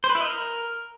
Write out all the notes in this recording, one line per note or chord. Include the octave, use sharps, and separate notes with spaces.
C5
B4
E4
D#5
A#4